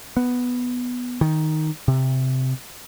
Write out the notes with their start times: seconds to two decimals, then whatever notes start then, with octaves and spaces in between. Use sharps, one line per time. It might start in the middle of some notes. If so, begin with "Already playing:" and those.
0.17 B3
1.21 D#3
1.88 C3